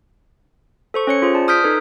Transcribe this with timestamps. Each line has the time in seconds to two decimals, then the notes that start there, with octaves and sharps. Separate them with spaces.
0.94 A4 C5 C#6
1.07 C#4 C#5 C#7
1.22 F4 G#4 C5
1.34 D5 A5
1.48 D#6 F6 G6 B6 D7
1.64 D#4 A4 B4